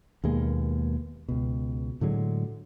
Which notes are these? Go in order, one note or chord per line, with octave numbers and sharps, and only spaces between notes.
D#2 B2 G#3 A#3
C#2 B2
A2 D3 F#3 G#3